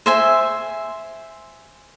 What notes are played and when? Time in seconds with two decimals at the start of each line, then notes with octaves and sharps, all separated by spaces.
0.06 C5 E5 G#5